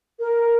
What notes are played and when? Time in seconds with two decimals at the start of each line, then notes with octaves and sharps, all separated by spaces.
0.19 A#4